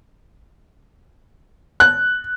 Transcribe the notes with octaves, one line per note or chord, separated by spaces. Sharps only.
F#6